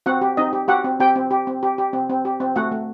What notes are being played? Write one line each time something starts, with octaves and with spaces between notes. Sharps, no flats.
C4 F#4 F#5
G4
C4 D#4 D#5
G4
F#4 G4 F#5
C4
C4 G4 G5
C4
G4
C4
G4
G4
C4
C4
G4
C4
A3 F#4 F#5
A3